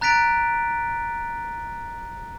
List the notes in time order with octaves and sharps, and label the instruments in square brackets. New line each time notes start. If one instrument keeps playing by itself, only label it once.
[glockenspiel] A#5 F#6 A6 B6 D7 F7